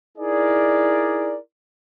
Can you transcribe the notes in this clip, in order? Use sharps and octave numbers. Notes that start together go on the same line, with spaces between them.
D#4 E4 G#4 A#4 D5